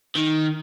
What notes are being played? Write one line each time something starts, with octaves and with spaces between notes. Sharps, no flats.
D#3